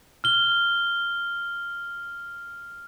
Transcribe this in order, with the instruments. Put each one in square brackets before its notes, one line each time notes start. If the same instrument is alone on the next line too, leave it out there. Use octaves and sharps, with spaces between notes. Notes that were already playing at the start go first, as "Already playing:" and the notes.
[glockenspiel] F6 G7